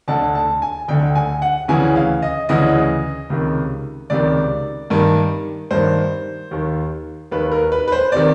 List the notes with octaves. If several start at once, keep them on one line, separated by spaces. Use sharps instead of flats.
D2 D3 A5
A5
G#5
D2 D3 G5
G#5
F#5
D2 C#3 E3 G#5
F5
D#5
D2 C#3 E3 D#5
C#2 C3 D#3
C#2 C3 D#3 D5
G2 D#3
G2 D#3 C5
D#2 D#3
D#2 D#3 B4
A#4
B4
B4
C5
C3 D#3 D5